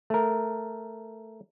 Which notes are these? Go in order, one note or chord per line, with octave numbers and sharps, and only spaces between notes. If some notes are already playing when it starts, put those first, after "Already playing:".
A3 A#4